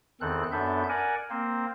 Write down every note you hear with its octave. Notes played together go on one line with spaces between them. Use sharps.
E2 D#3 C4 A4 F#6
F#2 B3 D4 A4 E5 G6
A#4 D5 F#5 G#5
A#3 C4 C5